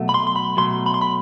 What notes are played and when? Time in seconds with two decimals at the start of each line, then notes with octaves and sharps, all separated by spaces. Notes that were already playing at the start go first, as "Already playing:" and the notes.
Already playing: B2 F#3 A3
0.09 B5
0.14 C6
0.27 C6
0.36 B5
0.57 B2 F#3 A3 C6
0.86 B5
0.94 C6
1.01 B5